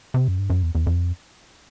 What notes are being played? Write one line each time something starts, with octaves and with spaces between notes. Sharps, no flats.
C3
F#2
G2
F#2
E2
E2
F2